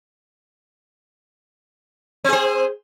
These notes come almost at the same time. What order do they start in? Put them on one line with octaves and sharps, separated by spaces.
C4 G#4 C5